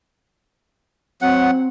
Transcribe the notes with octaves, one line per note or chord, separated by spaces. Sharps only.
F#3 C4 F#5